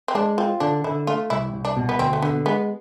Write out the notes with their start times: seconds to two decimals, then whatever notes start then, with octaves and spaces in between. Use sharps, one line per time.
0.08 C4
0.15 G#3 D4
0.38 C4 F4
0.60 D3 D4
0.84 D3 E4
1.07 A3 F4
1.30 C2 E4
1.54 C2
1.65 D4
1.77 B2
1.89 B3
1.99 D2 C4
2.13 A3
2.22 D3 B3
2.46 G#3 B3